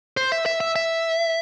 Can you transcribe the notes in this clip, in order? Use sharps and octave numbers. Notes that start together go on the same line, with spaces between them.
C5
E5
E5
E5
E5